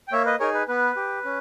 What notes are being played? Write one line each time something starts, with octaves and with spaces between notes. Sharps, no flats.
G5
A#3 C#5 E5
B4 D#5
D#4 G#4 A#4 C#5
B4
B3 B4
G4
C#4